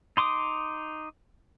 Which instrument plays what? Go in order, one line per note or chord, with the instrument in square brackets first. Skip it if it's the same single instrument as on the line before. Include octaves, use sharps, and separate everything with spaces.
[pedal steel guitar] D#4 C6 D6 D#6